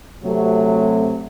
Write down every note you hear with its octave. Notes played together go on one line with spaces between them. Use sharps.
C3 F#3 A3